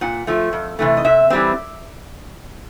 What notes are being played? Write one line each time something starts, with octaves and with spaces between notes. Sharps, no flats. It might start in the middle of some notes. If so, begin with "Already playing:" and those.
A#2 F#5
F3 A3
F2
C3 E3 A3
D#5
C3 E5
E3 G3 C4